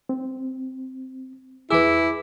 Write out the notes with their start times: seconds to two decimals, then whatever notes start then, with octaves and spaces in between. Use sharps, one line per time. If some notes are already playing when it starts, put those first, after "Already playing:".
0.09 C4
1.70 E2 E4 G#4 B4 D6 E6